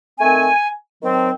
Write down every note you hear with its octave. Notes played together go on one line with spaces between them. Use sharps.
D#3 A3 C4 G#5
D#3 F#3 C4